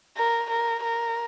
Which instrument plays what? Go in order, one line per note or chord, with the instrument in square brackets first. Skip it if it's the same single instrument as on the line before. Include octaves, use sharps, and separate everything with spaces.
[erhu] A#4
A#4
A#4